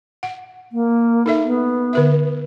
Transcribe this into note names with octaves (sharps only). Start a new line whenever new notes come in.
F#5
A#3
D#4 A4 E5
B3
D3 B4 E5